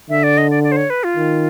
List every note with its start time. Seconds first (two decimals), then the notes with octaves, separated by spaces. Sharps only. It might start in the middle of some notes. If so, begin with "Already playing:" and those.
0.10 D3 E5
0.23 D5
0.38 D#5
0.50 D5
0.64 D5
0.72 C5
0.77 C#5
0.90 B4
1.04 F4
1.17 D#3